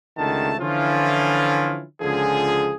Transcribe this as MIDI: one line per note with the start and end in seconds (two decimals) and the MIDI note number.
0.18 0.55 37
0.18 0.55 50
0.18 0.55 51
0.18 0.55 57
0.18 0.55 81
0.60 1.83 50
0.60 1.83 52
0.60 1.83 53
0.60 1.83 61
0.60 1.83 64
0.60 1.83 65
2.01 2.75 37
2.01 2.75 50
2.01 2.75 53
2.01 2.75 68